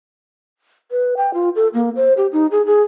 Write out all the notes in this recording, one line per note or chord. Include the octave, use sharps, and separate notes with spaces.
B4
G5
F4
A4
A#3
C5
G4
D#4
G#4
G#4